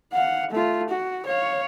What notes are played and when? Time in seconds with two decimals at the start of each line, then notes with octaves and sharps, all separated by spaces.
0.13 F5 F#5
0.51 A3 F4
0.89 F#4
1.26 C#5 F5